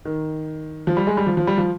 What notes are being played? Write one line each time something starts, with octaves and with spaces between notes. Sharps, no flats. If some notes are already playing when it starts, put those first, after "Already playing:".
D#3
F3
G3
G#3
G3
F3
F3
G3
F3